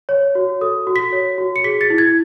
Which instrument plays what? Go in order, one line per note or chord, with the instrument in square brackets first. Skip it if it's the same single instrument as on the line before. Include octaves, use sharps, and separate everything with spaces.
[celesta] C#5
F#4
A4 D#6
F#4
B6
C#5
F#4
C#7
G#4 B6
A6
E4
G#6